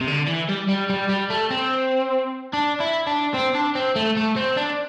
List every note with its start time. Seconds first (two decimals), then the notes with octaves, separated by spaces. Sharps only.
0.01 C3
0.07 D3
0.27 E3
0.49 G3
0.68 G3
0.90 G3
1.09 G3
1.30 A3
1.51 C4
2.53 D4
2.80 E4
3.07 D4
3.34 C4
3.55 D4
3.75 C4
3.96 A3
4.17 A3
4.36 C4
4.57 D4